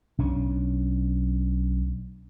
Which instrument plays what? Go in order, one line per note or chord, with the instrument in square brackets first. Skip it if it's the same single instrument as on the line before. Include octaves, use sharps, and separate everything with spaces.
[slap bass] B1 C#4 D4